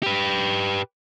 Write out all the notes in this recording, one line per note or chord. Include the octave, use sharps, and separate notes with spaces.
G4 B4